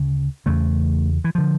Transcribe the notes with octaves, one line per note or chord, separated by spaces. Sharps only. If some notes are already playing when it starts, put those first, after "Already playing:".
Already playing: D2 C#3
E2 C#3 A3
E3
D3 F3